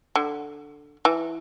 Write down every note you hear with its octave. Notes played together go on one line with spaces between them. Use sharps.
D3
E3